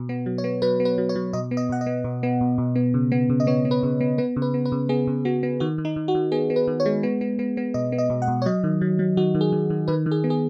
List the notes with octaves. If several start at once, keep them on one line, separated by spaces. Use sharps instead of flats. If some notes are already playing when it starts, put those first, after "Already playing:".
Already playing: B2
B3
F#3
C#5
B3
F#3 B4
B3
B4
F#3
C#5
F#3
B2 D#5
B3
D#5
B2 F#5
D#5
B3
B2
B3
B2
B2
B3
C#3
B3
C#3
D#5
B3 C#5
B3
B4
C#3
B3
B3 B4
C#3
B4
B3
B4
C#3
B3 G#4
C#3
B3 F#4
B3
D#3 F#4
D#3
D#4
D#3
F#4
D#3
B3 G#4
B3
B4
D#3
C#5
G#3
B3
B3
B3
B3
B2 D#5
B3
D#5
B2
F#5
B2
C#5
F#3 D#5
D#3
F#3
F#3
D#3 F#4
D#3
G#4
D#3
D#3
D#3 B4
D#3
G#4
B3
G#4